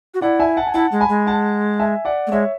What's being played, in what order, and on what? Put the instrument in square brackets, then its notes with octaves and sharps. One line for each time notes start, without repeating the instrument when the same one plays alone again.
[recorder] F#4
[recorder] E4 [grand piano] D5 F#5
[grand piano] E5 G#5
F#5 A5
G#5
[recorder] E4 [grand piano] F#5 A5
[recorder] G#3
[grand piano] G#5 B5
[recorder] G#3
[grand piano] F#5 A5
E5 G#5
D5 F#5
[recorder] A3
[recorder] G#3 [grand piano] C#5 E5